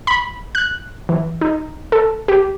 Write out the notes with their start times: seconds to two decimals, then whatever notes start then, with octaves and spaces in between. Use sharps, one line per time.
0.07 B5
0.55 F#6
1.09 E3
1.41 D#4
1.92 A4
2.28 G4